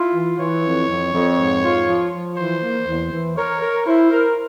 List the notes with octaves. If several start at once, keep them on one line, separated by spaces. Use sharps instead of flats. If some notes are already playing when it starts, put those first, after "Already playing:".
Already playing: E4 F4
E3
E3 C#5
F2
F2
F2
G#2
F4
F3
F3
E3 C5
A#3
E2
E3
A#4 C#5
A#4
E4 C5
A#4